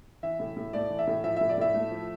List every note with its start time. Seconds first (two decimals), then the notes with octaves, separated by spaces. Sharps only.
0.23 E3 E5
0.39 A2
0.56 A2
0.73 A3 D5
0.90 E3
0.99 E5
1.07 A2
1.24 F3 E5
1.37 A2 E5
1.49 D5
1.57 A2 E5
1.74 A3
1.91 F3